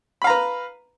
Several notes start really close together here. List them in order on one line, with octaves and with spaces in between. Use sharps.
B5 F5 A#5 B4